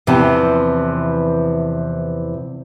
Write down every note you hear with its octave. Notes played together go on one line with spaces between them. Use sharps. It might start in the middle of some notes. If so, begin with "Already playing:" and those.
E2 C3 E3 F3